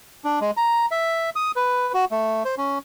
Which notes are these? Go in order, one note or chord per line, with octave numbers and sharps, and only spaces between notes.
D4
G#3
A#5
E5
D#6
B4
F#4
A3
C5
C#4